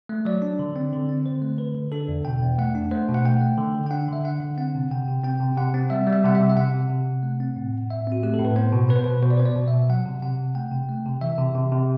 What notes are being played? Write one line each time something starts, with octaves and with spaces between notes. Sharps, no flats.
A3
F#3 D5
D4
D3
C4
D3
C4
D3 C5
A3
D3 B4
D3
D4 A4
E2
B2 G5
E2
A3 F#5
D4
A3 C5
B2
F#5
A3 G5
A3
D3
D3
G5
D4 F#5
D3 E5
D4 F#5
D3
C4 F#5
C3
C3 G5
C3
C4 G5
C3
C3 F#5
C4
G3 E5
G3
E5
C3 F#5
E5
C3
E5
C3 F#5
C3
C3
C3
A3
C4
A2
A2
A2 E5
C4 F#4
A3 G4
A4
A2
B4
B3 C5
B2
B3 B4
C5
B2 B4
B2 C5
D5
B3 C5
D5
B2
E5
B2
F#3 F#5
C3
C3 F#5
C3
A3 G5
C3
A3
C3
E3 E5
C3
C3
C3